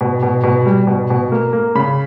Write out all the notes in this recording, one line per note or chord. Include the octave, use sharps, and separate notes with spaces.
B2
B2
B2
G3
B2
B2
A#3
A#3
C#3 B5